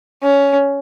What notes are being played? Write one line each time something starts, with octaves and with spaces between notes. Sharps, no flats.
C#4